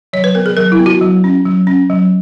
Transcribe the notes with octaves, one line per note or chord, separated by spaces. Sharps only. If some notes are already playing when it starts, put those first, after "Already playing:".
F#3 C#5
B4
B3 A#4
G#4
F#3 A#4
E4
B3
F#4
F#3
C#4
F#3
C#4
F#3